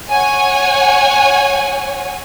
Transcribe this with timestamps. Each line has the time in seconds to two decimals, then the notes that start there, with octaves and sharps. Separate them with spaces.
0.10 C#5 F#5 G#5